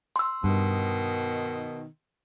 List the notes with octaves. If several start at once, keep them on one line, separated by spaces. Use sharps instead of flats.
C6 E6
G2 B2 D#3